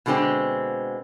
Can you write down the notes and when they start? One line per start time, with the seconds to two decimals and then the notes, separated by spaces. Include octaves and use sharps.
0.06 B2 D3 G#3 A#3 C4